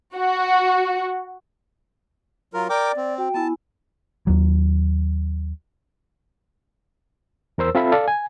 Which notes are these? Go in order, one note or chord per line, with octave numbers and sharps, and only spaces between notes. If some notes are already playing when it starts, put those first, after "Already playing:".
F#4
F#3 F4 A#4
A#4 D5 G5 D6
C4
F#4 G5
B3 E4 G#5 A5
D#2 F#3
E2 A#4 C5 E6
C4 F4 A4 E5 B5
A4 D5 F5
G#5